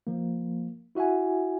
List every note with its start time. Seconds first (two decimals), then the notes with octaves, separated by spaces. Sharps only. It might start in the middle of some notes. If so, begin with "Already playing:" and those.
0.07 F3 A#3
0.95 E4 F#4 E5 F#5 G#5